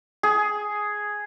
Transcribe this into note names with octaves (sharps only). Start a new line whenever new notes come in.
G#4